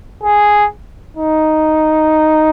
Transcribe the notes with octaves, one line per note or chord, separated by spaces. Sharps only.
G#4
D#4